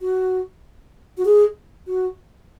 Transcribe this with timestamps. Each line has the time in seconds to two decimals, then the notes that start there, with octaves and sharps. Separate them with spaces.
0.01 F#4
1.18 F#4
1.25 G#4
1.87 F#4